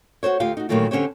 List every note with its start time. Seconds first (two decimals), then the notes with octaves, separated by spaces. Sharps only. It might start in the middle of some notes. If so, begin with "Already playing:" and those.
0.23 F#4 A4 C5 C#5
0.40 D2 F4 G4 F5
0.57 D#4 F#4
0.69 A#2 D#3 E3 F#3 A3 F4
0.91 F2 D3 C#4 G4 C5 C#5